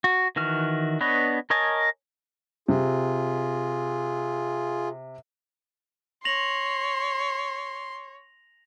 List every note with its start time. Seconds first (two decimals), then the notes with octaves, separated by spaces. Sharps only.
0.04 F#4
0.36 D#3 E3 F#4 F6
1.01 B3 D4 B4 C#5 D#5
1.50 A#4 C#5 D#5 G#5 A5
2.68 C3 F4 G#4
6.25 C#5 C6 A#6 F7 F#7